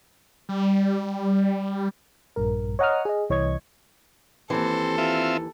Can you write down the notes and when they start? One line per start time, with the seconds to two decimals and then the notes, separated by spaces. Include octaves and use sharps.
0.49 G3
2.36 A#1 G2 A#4
2.79 C#5 D#5 F#5 A#5 D#6 F6
3.05 G#4 D#5
3.29 C2 E3 C#5 D#5 C#6 G#6
4.50 D#2 G#2 E3 C4 A4
4.98 C4 F4 E5